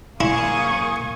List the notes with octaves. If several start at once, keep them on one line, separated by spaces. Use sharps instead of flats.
F#2 A#3 E4 G#4 C#6 D#6 G#6